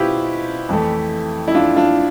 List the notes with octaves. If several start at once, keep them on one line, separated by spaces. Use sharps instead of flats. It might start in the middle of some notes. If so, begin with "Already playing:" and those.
Already playing: B2 E4 F4 G4 B4 C5
F2 E3 A3
E4
D4 F4
D4 F4